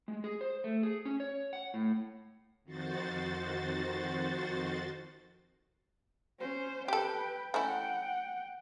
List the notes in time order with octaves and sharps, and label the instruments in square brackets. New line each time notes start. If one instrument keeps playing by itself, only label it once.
[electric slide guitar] G#3
G#4
C5
A3
G#4
C#4
C#5
F#5
A2
[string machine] F2 D#3 F#4 C5 A6
[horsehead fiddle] C#4 C5
[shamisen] G4 A4 [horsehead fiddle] B4 G5
[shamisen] A3 C#4 E4 [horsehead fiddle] F#5 G5